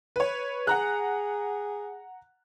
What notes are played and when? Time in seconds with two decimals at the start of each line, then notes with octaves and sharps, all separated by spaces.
0.16 B4 C#5
0.67 G#4 F#5 A#5 F#6